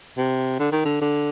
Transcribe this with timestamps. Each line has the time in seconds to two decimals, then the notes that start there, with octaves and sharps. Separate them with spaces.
0.17 C3
0.59 D3
0.72 D#3
0.85 D3
1.01 D3